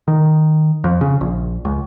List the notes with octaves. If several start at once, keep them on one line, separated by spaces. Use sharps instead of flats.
D#3
F2
C#3
A#1
C#2